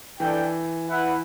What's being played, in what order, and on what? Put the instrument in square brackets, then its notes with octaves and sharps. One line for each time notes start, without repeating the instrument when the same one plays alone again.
[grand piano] E3 [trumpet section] D4 A4 D5 G5
[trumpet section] E4 B4 F#5